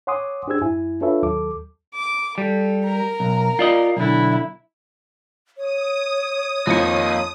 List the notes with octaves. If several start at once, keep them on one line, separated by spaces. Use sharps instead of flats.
C#5 F#5 G#5 C6 D6 D#6
D4 G4 G#4 C5 E6 G#6
F#2 E4 G#5
D4 F4 A4 B4 C#5 E5
D#2 F#3 A4 D6
D6
G3 A4
A#4 A#5
B1
F4 D5 D#5
B1 D3 E4
C#5 D#6
F2 A#3 C4 D#4 C#7